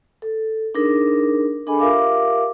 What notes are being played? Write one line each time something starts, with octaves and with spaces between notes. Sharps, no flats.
A4
D4 D#4 G#4 A#4
D4 G#4 A4 D#5 G#5 B5
F4 G4 A#4 E5 F5 D6